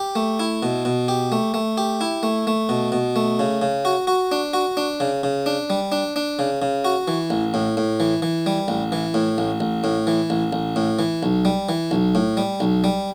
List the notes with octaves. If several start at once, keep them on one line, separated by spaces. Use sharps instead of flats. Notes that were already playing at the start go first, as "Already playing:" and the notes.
Already playing: G4
A3
E4
B2
B2
G4
A3
A3
G4
E4
A3
A3
B2
B2
A3
C#3
C#3
F#4
F#4
D4
F#4
D4
C#3
C#3
D4
G3
D4
D4
C#3
C#3
F#4
E3
A1
A2
A2
E3
E3
G3
A1
E3
A2
A1
A1
A2
E3
A1
A1
A2
E3
B1
G3
E3
B1
A2
G3
B1
G3